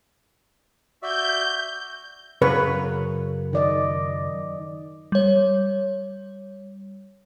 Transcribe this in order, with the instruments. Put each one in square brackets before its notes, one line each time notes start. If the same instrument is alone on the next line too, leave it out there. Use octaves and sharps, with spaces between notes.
[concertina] F#4 D5 E5 [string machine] G6
[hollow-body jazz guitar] F#2 C#3 C#5 [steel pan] B4
[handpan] D#3 D5 D#5
[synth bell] G3 C#5